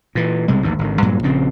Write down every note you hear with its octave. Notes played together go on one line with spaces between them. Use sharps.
A#2 E3
B1 C3 G3 G#3
A1 D#2 G#2
G#1 D3 D#3
G2 A#2 F#3
A#1 A#2 C#3 C4